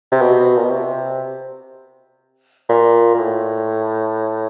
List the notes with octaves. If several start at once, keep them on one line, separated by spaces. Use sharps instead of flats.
C3
B2
A#2
B2
C3
A#2
A#2
A2